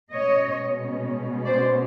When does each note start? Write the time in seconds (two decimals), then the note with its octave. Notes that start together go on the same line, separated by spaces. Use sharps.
0.12 B2 G#3 C#4 C#5 D#5
1.45 C5 D5